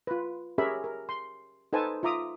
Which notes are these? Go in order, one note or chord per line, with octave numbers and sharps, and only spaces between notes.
F4 B4
C#4 G4 G#4 A#4 E5 B5
A#4
C6
D#4 A4 B4 C5 G#5 A5
F4 E5 A#5 D6 D#6